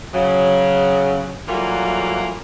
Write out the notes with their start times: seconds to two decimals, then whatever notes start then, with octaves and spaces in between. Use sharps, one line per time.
0.13 C#3 F#3
1.49 E3 F#3 G3 A3 A#3 F4